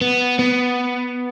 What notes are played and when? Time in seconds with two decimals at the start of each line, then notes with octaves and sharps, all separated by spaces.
0.01 B3
0.39 B3